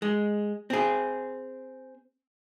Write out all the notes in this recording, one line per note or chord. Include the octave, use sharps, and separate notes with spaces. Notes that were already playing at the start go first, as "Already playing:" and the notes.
G#3
C4 G#4